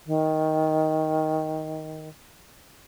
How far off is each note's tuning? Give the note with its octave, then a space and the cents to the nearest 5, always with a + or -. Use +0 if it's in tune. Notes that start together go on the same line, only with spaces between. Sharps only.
D#3 +10